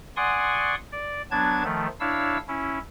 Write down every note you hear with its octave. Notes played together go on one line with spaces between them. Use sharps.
D5 F#5 G#5 C6 C#6 D#6
D5
F#3 B3 D4 A5 G#6
D#3 F3 A3
D4 E4 C#5 F5 E6
C#4 E4